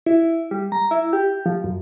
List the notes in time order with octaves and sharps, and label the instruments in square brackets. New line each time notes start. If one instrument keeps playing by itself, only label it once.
[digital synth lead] E4
G3
A#5
E4
G4
F3
F#2